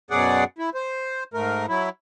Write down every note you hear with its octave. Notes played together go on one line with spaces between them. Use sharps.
F#2 B2 F#3 G#4 D5 F#5
E4
C5
G#2 A3 A#4
F#3 E4